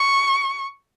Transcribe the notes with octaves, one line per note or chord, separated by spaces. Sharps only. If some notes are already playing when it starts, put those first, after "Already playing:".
Already playing: C#6